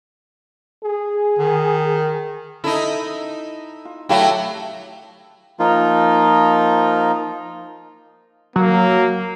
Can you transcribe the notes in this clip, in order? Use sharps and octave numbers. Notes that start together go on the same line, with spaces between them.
G#4
D#3
D#4 E4 A4
F4
F#3 A3 E4 G4 F5
F3 A#3 D#4 F4
F#3 A#3